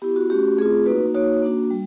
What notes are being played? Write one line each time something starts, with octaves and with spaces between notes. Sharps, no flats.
B3 E4 G4
F#4
A3 C#4 F#4 G4
A3 C4 F4 G#4
A#3 D#4 F#4 B4
A#3 D#4 F#4 C#5
A#3 D4 F#4
G3